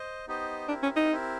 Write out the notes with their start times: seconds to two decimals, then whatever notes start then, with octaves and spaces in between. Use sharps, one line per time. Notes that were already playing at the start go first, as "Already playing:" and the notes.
Already playing: C5 D#5
0.27 B3 D#4 G4 C5 D#5
0.69 C4 D4 E4 G4 A#4
0.83 C#4
0.97 D#4
1.11 C4 E4 G4 A#4